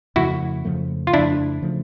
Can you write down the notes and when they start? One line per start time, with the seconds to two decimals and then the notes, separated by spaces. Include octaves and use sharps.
0.16 F2 C#3 F3 A3 E4 F#4
0.65 F2 C#3 F3 A3
1.07 F4
1.13 F2 C#3 F3 A3 D4 E4
1.62 C#3 F3 A3